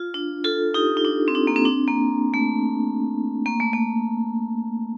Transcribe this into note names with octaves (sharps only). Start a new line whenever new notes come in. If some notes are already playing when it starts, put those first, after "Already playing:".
Already playing: F4
D4
F4 A4
D#4 G4
D#4
D4
C4
D4
A#3
C4
D4
A#3
A3
A#3
A3
A#3